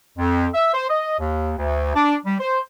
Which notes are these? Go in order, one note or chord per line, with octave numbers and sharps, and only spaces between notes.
F2
E5
C5
D#5
D#2
D2
D4
G3
C5